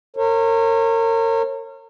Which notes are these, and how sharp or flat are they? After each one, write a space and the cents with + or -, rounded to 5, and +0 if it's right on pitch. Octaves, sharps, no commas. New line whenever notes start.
A#4 -35 C#5 -30